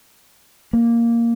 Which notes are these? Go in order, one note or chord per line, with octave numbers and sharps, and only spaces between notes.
A#3